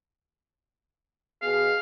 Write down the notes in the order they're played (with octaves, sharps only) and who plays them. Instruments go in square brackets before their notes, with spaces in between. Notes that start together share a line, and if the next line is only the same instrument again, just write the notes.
[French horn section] B2 G#4 [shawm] F5